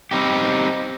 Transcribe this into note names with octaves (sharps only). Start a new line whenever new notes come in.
G3 C4 D#4 G4